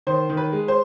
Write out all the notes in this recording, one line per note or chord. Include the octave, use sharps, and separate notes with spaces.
D#3 C5
D#3
B4
G#3
C5